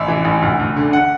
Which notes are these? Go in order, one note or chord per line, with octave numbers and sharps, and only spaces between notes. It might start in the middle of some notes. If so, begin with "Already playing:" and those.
Already playing: A1 E5
E3
A1
D2
D2
D3
F#5